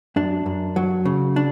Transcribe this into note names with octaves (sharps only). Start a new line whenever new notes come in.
F#2 D4
F#2
F#3
C#3
D4